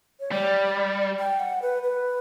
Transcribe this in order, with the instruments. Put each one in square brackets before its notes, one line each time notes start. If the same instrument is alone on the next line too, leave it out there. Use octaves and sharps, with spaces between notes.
[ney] C#5
[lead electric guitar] G3 [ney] D5
[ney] G5
F#5
B4
B4